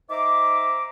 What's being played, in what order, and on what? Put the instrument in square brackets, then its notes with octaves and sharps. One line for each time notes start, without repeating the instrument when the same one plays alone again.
[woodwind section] D#4 C5 E5 A#5 D6